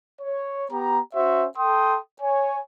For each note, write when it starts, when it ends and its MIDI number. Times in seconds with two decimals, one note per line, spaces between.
0.21 0.65 73
0.71 1.00 59
0.71 1.00 67
0.71 1.00 82
1.15 1.47 61
1.15 1.47 66
1.15 1.47 72
1.15 1.47 76
1.57 1.98 69
1.57 1.98 79
1.57 1.98 84
1.57 1.98 87
2.21 2.59 73
2.21 2.59 80